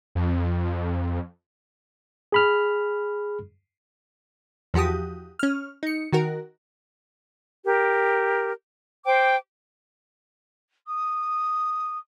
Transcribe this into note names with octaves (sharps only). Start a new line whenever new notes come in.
F2
G#4 B5 F6
E2 F3 F#4 G4 D#6
C#4 F6
D#4 C#7
D#3 F#4 A#4
G4 A#4
C5 G5 D6
D#6